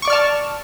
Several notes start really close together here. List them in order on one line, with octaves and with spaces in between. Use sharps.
C#6 D6 D5 F6 A5